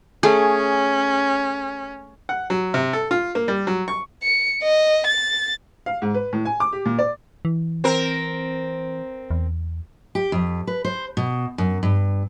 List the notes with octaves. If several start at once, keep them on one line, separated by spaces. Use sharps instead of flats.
A3 C#4 G#4
F#5
F#3
C3
A4
F4
A#3
G3
F#3
C#6
C#7
D#5
A6
F5
G#2
B4
A2
G#5
D6
G4
A#2
D5
E3
C4 A#4
E2
G4
F2
B4
C5
B2
F#2
G2